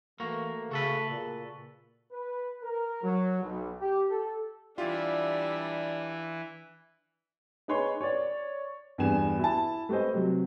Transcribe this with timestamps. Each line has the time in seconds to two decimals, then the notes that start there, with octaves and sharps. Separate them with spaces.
0.20 E3 A3 A#3 F#4
0.71 C#3 F#4 A4 B4
1.10 A#2 C#3
2.12 B4
2.62 A#4
3.02 F#3
3.41 B1
3.80 G4
4.10 A4
4.78 E3 G3 D4 F4 E5
7.68 D#4 G#4 B4 C#5 C6
8.01 C#5 D5
8.98 E2 G2 B3 G#4 G#5 E7
9.39 E4 A5
9.89 A3 G4 B4 C5 D#5
10.14 C3 F#3